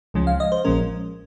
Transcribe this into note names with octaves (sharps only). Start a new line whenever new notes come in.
C#2 C#3 F3 G#3 C#4
F5
D#5
C5
A#1 A#2 F3 G#3 C#4 A#4